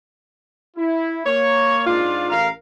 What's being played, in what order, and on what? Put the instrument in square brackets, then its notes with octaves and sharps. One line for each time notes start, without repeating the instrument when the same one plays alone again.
[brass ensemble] E4
[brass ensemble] A#3 [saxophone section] C#5
[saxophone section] G#2 D4 F4
[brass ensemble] A1 A#4 F5